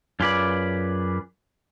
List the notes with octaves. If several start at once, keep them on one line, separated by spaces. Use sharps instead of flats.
F#2 F4 G#4 B4 D5